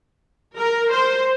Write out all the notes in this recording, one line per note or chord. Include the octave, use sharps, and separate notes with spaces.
A#4
C5